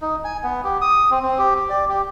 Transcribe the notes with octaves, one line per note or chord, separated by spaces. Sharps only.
D#4
G#5
B3
G4
D#6
C4
C4
G4
G4
D5
G4